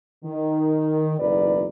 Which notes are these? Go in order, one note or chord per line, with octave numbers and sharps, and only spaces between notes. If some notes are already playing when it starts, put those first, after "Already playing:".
D#3
F#1 B1 E2 A#4 B4 D5